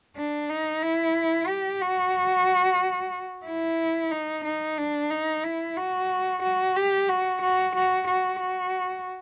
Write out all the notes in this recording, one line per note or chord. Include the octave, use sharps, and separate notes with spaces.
D4
D#4
E4
G4
F#4
E4
D#4
D#4
D4
D#4
E4
F#4
F#4
G4
F#4
F#4
F#4
F#4
F#4